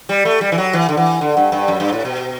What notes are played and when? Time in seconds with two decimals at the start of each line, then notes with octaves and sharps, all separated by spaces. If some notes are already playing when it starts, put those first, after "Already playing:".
0.09 G3
0.25 A3
0.41 G3
0.52 E3
0.58 F#3
0.73 E3
0.89 D3
0.97 E3
1.21 D3
1.37 G2
1.52 G2
1.68 F#2
1.80 G2
1.93 A2
2.05 B2